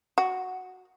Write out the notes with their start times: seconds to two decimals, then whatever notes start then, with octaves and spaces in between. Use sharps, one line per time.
0.18 F#4